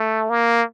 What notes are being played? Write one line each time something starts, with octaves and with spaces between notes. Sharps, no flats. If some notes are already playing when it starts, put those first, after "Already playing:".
Already playing: A3
A#3